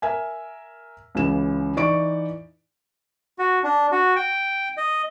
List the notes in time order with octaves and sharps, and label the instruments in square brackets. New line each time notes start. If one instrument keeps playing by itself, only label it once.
[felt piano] A#4 E5 G#5
C#2 C#3 E3 E7
E3 D#4 D5 C#6 D7
[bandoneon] F#4
D4
F#4
G5
D#5